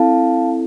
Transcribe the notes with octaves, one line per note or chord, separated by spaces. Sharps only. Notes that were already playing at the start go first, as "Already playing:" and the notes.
Already playing: C4 E4 A4 F5 A5